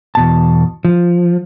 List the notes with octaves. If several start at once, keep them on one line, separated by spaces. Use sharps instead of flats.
E2 B2 A5
F3